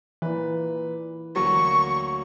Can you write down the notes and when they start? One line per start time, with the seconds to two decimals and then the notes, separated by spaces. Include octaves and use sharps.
0.22 A#2 E3 B4
1.35 D2 F#3 A#3 C#6